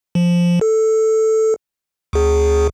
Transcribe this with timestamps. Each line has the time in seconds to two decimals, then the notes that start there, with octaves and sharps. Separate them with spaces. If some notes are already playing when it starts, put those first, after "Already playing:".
0.15 F3
0.61 A4
2.13 D2 G#4